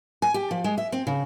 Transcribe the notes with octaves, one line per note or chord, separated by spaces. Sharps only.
G#5
G4
F3
G#3
E5
C4
C#3